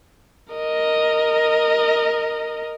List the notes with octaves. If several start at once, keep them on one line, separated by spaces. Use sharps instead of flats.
A#4 D#5